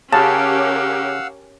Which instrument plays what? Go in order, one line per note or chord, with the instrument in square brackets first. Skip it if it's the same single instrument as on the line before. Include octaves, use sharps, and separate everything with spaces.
[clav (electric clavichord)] C#3 [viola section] C#4 G4 A#4 [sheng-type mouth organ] F5 F#5 E6 [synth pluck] A5